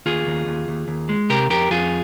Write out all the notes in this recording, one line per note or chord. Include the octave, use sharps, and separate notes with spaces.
D#2 F4 G#4
D#2
D#2
D#2
D#2
G#3
C3 G4 A#4
F2 G4 A#4
F2 F4 G#4